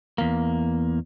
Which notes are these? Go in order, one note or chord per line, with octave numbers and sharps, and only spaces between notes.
E2 A#3